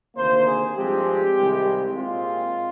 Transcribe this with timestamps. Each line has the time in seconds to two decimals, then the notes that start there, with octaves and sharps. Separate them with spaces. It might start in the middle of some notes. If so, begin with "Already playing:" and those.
0.15 D2 C3 D#3 A#3 C5
0.46 G#4
0.76 G2 F3 G#3 C4 G4
1.38 C2 C3 D#3 G#3 C4
1.98 A#2 G#3 C4 F4